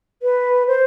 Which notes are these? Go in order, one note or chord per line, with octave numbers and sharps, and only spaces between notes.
B4
C5